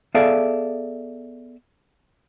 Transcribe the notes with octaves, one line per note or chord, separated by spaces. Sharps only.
B3 G#4 A4 D5 E5 F5